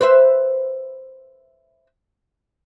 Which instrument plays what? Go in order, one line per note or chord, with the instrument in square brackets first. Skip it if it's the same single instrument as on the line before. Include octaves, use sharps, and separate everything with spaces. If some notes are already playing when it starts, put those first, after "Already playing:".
[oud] B4 C5 E5